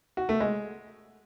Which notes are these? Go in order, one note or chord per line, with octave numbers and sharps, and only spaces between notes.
F#4
A3
G#3